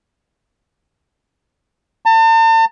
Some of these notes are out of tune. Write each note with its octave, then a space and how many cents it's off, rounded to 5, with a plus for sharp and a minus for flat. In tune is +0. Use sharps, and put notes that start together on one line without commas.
A5 +40